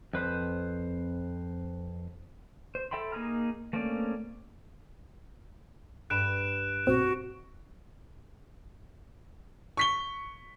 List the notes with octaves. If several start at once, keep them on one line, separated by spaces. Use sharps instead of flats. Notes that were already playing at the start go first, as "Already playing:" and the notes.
F2 B4 C5
C5
A4 E5 G5 B5 C6
A#3 D#4 G#4 A#5 F6
A3 A#3 C4 C#4 D5
G2 B4 B5 F#6 D7 E7
B1 C4 F#4
C#6 B6 G7